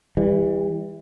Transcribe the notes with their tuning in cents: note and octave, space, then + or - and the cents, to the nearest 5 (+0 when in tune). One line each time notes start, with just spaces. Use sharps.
E3 -10 G3 +30